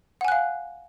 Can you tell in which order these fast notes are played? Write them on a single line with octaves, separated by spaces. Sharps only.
F#5 G#5 F#6 F5